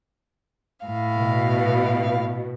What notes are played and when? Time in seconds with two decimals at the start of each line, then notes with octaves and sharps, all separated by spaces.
0.85 A2 F5
1.19 B2